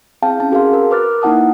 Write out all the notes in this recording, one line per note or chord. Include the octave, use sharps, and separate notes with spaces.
C4 E4 G#4 F5 G5 A5
C#4 A5
F#4 G#4 A#4 F5 C6
A#4
A#4 B4 D6 F6 F#6 A6
A#3 D#4 E4 F#5 A5 D#6